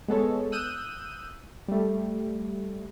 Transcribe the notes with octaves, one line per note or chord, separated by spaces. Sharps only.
G#3 B3 A4 C#5
D#6 E6 F#6 G6 D#7
G3 A3